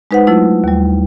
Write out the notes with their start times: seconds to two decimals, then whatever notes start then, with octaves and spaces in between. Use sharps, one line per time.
0.11 G#3 D#4 B4 C5 F#5
0.27 F#3 A3 E4 F4
0.64 D#2 G3